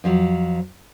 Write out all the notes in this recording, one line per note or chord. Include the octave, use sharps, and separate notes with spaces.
F2 F3 F#3